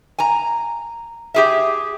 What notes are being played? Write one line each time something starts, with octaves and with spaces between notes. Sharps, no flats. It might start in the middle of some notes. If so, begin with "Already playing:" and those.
G#5 A#5
G4 G#4 E5